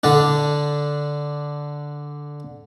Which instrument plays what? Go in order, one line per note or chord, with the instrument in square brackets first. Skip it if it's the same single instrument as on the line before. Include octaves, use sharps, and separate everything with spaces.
[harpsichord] D3 D4